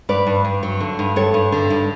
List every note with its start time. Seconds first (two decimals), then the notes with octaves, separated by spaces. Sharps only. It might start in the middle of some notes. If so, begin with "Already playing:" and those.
0.09 G2 B4 D5
0.27 G2
0.45 G2
0.63 F#3
0.80 D3
0.99 G2
1.16 G2 A4 C#5
1.34 G2
1.52 D3
1.70 G2